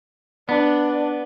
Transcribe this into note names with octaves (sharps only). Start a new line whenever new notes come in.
B3 D4